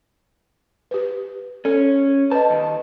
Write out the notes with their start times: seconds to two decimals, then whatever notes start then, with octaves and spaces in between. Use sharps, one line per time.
0.91 G4 B4
1.65 C#4 A4
2.31 B4 D#5 A5
2.50 D#2 D#3